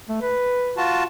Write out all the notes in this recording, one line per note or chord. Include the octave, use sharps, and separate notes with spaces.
A3
B4
F4 F#4 A5